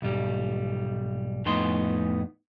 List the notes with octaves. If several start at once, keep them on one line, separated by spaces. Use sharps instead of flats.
B1 G#2 G3
F2 A2 B3 D#4 C6